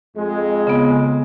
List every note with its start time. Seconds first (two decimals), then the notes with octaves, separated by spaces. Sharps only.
0.16 F2 G#3
0.67 C#3 B3